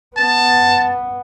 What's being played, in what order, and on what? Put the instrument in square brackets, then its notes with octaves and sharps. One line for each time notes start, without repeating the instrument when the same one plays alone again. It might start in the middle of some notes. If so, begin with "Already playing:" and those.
[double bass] B3 [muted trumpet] A5